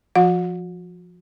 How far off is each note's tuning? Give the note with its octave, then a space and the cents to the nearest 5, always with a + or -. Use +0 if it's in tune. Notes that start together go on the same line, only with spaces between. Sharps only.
F3 +0 F#4 -35 F#5 -40